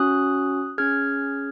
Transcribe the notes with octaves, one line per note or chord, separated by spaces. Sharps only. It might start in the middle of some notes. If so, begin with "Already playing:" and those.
Already playing: C#4 F#4 D#6 F#6
C#4 G#4 F6 G#6